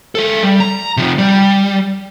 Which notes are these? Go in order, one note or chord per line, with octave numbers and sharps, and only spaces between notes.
G#3 A4
G3
A#5
C3 F3
G3